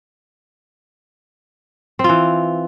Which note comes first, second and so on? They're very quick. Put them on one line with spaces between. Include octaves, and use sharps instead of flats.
C4 F4 E3